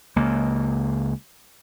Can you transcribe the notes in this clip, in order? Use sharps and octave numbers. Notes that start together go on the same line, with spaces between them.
C#2 A#3